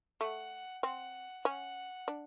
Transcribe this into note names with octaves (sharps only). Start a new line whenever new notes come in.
A3 F#5
C4 F#5
C#4 F#5
D4